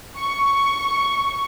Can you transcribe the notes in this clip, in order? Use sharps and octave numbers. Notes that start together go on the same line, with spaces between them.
C#6